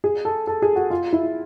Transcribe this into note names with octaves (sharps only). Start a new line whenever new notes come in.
G#4
A4
A4
G#4
F#4
F4
E4